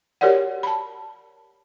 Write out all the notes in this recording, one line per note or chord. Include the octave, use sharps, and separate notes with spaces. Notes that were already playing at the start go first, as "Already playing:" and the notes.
F#4 G4 A#4 C#5 D5 F#5
A5 B5